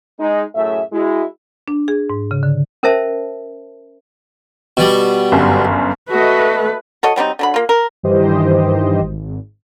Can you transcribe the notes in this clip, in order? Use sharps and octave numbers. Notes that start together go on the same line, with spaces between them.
G#3 D#4
F#2 A2 A3 G#4 E5
G#3 E4 F#4
D4
G#4
G#2
C#3
D3
C#4 A#4 C5 E5 A5
B2 G3
G1 F#2
A3 F#4 B4 D#5
F#4 A4 C#5 D#5
F#3 G3 C4 D#4
D3 F#3 B5
A#3 F4
A#4
G2 D#3 E3 G4 C5 D#5
G#1